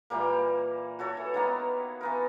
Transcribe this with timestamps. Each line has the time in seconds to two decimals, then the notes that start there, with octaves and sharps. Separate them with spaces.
0.10 A#2 E3 G3 A#3
0.99 F#4 A4 C#5
1.17 E3
1.34 D#3 A#3 B3
2.01 E3 B3 A#4